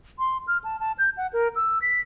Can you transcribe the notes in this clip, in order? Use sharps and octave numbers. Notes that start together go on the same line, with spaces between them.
C6
F6
A5
A5
G6
F#5
A#4
E6
B6